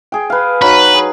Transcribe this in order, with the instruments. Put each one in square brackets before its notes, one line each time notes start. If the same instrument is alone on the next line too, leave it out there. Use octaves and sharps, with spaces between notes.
[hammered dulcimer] G#4 G5
B4 F5
[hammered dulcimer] F#3 D#4 [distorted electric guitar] B4
[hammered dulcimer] G#4